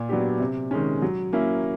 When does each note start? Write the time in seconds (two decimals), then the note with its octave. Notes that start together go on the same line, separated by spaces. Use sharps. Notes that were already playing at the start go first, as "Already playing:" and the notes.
Already playing: A#2
0.09 F#3 B3 D4 G4
0.40 C3
0.71 D#3 G#3 C#4
1.02 F#3
1.33 A#3 C#4 E4